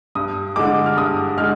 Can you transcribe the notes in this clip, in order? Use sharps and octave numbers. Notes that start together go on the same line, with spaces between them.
G2 D#6
D3 G#3 D6
F6
G2 D#6
D3 G#3 F6